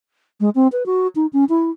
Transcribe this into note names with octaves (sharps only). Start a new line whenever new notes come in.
G#3
C4
B4
F#4
D#4
C#4
E4